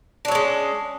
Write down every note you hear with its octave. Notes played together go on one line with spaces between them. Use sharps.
F#3 G#3 C#4 D4